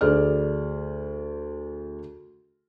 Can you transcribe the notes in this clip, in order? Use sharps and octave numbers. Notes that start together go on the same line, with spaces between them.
D2 G#4 D5 F6